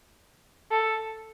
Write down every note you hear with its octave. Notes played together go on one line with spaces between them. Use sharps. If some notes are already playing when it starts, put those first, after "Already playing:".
A4